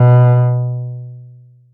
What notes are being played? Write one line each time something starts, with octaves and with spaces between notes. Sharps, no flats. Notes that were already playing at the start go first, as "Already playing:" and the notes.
Already playing: B2